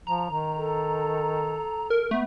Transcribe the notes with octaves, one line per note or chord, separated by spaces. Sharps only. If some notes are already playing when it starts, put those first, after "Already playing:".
F3 A#5
D#3
A4
A#4
A3 B3